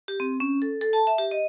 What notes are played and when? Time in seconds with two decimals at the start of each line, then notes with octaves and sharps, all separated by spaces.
0.08 G4
0.20 C4
0.40 C#4
0.62 A4
0.81 A4
0.93 A5
1.07 E5
1.18 G4
1.31 D#5